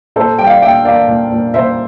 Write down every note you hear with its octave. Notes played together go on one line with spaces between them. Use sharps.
A#2 A4 C5
G3 G5
D5 F5
A#2 E5 G5
A#3 D5 F5
A#2
A#2
A#2 C5 E5